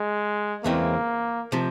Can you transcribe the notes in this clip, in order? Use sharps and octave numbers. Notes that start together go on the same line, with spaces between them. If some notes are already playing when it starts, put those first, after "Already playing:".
Already playing: G#3
E2 C#3 E3 G#3 A#3 C4
C3 F3